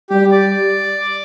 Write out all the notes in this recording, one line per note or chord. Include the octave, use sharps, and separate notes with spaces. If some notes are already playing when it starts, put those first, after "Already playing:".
G3 G4
D5